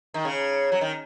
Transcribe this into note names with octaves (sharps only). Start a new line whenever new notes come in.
D#3
C#3
F#3
D#3